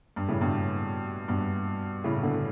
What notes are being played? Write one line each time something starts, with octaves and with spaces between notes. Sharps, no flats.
G2
A2 C#3
G2 B2
G2 B2
A2 C#3
B2 D3